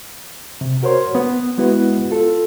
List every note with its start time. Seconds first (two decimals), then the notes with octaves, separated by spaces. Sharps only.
0.61 C3
0.83 F#4 A#4 C5 C#5 C6
1.15 B3
1.58 G#3 B3 E4 F#4 B4
2.11 F4 A4